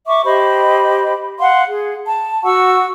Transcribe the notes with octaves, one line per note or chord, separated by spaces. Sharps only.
E5 C#6 D6
G4 C5 D#5 B5
F5 F#5 C6
G#4
A5
F#4 F#5 C#6 E6